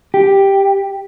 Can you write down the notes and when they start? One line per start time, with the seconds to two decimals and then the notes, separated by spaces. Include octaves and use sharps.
0.14 G4